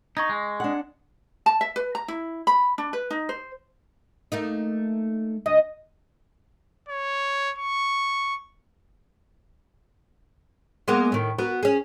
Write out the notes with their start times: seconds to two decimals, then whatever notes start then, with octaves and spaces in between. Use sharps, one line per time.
0.17 D#4 C#6 G#6 A#6
0.29 G#3
0.60 D4 F#5
1.46 A5
1.61 E5
1.76 B4
1.95 A#5
2.08 E4
2.47 B5
2.78 D4
2.93 B4
3.11 D#4
3.29 C5
4.32 A3 A#3 D#4
5.46 D2 D#5
6.89 C#5
7.59 C#6
10.88 G#3 A#3 B3
11.12 A2 D#3
11.39 B3 F#4 A#4
11.63 C#4 G#4